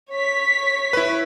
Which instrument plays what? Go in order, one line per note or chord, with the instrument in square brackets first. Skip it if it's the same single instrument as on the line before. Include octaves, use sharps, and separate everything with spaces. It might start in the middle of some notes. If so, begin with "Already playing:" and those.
[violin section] C#5 B6
[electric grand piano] E4 B4